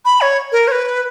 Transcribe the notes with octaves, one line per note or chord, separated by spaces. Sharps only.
B5
C#5
A#4
C#5
B4